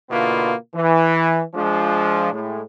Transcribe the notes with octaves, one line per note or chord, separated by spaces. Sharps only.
B2 D3 A#3 B3 E4 F4
E3
F3 G#3 D4
A2 G#3